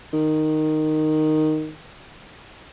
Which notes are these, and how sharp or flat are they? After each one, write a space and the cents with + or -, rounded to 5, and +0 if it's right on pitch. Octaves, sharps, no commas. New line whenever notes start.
D#3 -5